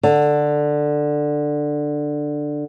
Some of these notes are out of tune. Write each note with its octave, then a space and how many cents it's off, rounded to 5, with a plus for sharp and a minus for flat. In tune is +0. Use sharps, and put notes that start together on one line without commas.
D3 +10